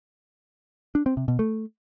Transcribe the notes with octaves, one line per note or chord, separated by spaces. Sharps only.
D4
C4
C3
B2
A3